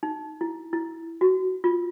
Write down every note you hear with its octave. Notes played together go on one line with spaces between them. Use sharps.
D#4
E4
E4
F#4
F4